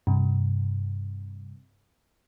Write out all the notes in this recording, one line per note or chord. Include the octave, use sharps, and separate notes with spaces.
G2 C3